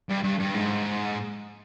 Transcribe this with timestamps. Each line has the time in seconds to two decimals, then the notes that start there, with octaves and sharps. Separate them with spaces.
0.09 G2
0.23 G2
0.39 G2
0.54 G#2